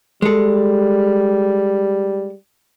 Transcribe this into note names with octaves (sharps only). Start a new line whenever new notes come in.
G3 G#3 A4